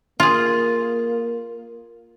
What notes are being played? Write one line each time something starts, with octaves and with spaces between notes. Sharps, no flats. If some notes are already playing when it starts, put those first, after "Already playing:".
A#3 F4 G#4